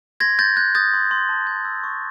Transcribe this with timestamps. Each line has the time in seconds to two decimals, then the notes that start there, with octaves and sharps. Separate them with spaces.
0.20 C6 G#6 A#6
0.39 C6 G6 A6
0.56 F#6 G6
0.75 D#6 G6 A6
0.93 C6
1.11 C6
1.29 A5
1.47 G6
1.65 E6
1.83 C#6